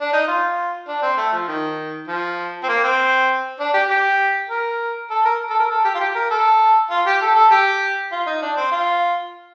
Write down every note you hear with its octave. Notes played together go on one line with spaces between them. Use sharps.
D4
D#4
F4
D4
C4
A3
F3
D#3
F3
C4
A#3
C4
D4
G4
G4
A#4
A4
A#4
A4
A#4
A4
G4
F4
G4
A#4
A4
F4
G4
A4
A4
G4
F4
D#4
D4
C4
F4